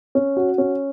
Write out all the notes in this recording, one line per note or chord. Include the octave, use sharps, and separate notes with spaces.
C#4
F#4
C#4